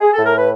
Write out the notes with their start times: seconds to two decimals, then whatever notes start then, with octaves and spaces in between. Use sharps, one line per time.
0.01 G#4
0.14 A2 A4
0.25 A#4
0.37 B4